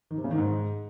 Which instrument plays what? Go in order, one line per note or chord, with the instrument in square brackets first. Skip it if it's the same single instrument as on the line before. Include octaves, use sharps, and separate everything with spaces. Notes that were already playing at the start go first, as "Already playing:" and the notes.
[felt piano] D#3
C3
C#3
D#3
G#2